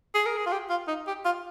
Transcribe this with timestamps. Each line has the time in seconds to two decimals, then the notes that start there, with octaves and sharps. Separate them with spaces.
0.15 G#4
0.26 A#4
0.37 G#4
0.46 F4
0.52 G4
0.70 F4
0.88 D#4
1.07 G4
1.25 F4